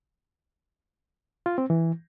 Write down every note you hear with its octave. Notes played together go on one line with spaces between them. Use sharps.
F4
C4
E3